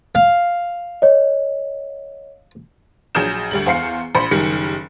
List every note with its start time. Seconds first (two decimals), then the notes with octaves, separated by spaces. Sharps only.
0.15 F5
1.02 C#5 D#5
3.15 A#1 F#3 G#4 D#6 G6 E7
3.51 D2 G3 F#7
3.66 E2 C5 F5 C7 C#7
4.15 A#1 C5 B5 C#7
4.31 F#1 D#3 G3 C#7